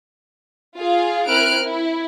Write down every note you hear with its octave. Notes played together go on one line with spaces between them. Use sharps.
F4 G#4 F5
C4 E4 A#4 F6 F#6 D7
E4